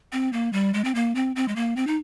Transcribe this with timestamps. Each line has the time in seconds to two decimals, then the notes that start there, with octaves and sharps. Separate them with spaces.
0.12 C4
0.33 A#3
0.53 G3
0.74 G#3
0.84 C4
0.95 A#3
1.15 C4
1.36 C4
1.48 G#3
1.56 A#3
1.76 C4
1.87 D#4